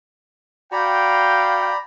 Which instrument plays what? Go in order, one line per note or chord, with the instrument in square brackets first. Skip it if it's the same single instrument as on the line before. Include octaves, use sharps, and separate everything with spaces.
[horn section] F#4 F5 G5 [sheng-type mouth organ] D5 A#5 B5